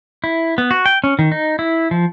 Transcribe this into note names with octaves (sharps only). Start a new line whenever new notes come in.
E4
B3
F#4
G5
C#4
D#3
D#4
E4
F3